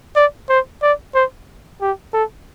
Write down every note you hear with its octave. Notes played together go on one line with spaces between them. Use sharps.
D5
C5
D5
C5
G4
A4